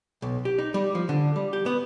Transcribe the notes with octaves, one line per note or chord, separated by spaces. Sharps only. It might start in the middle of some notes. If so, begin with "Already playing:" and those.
B1
G4
D#4
G3
F3
D3
G3
G4
B3